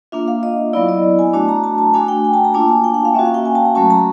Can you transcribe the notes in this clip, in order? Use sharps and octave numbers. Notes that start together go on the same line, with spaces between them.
A#3 D4 F4 E5
F5
D#5
F#3 B3 E4 D5
D#5
G#5
A3 D4 F#4 A5
A#5
A5
A5
A3 D4 F#4 G#5
G5
G#5
A5
A#5
A#3 D4 F4 A5
G#5
G5
F#5
F5
A#3 C#4 F#4 E5
F5
G5
G#5
A5
A#5
F#3 A3 C#4 F#4 A5
A#5